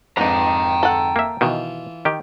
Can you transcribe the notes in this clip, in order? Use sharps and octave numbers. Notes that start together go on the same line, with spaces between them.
F2 G#2 D4 D#4 B4 G5 A#5
A4 F#5
A#3 E5
B2 D#3 E3 F4
D#3 G4